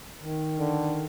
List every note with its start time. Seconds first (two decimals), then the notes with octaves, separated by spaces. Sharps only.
0.21 D#3
0.59 D3